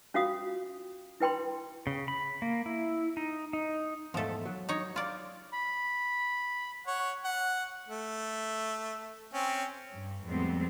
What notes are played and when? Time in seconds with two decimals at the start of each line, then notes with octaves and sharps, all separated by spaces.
0.14 C#4 F4 F#4 F5 D#6
1.20 E4 B4 G5 B5 C6
1.87 C#3
2.08 B5
2.42 A#3
2.66 E4
3.17 D#4
3.53 D#4
4.14 E2 G#2 F3 A3 A4
4.45 F#3
4.69 D#4 C#5
4.96 F4 D5
5.53 B5
6.87 C#5 F#5
7.24 F#5
7.88 A3
9.33 C4 C#4
9.91 G2
10.24 F2 A2 G3 G#3 B3 C4